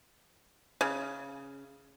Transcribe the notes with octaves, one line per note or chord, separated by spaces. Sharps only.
C#3